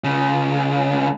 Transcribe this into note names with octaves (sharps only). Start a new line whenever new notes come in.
C#2 C#3